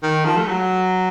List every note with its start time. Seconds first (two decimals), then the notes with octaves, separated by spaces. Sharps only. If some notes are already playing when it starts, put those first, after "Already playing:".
0.03 D#3
0.25 F3
0.37 A3
0.48 F#3